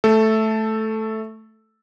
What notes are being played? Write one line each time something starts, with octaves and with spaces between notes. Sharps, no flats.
A3 A4